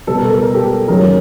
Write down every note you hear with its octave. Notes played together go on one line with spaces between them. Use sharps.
B2 G3 B3 A4
A#4
A4
A#4
G4 A4
F#2 D#3 F#3 A#3 C#4 G#4 A#4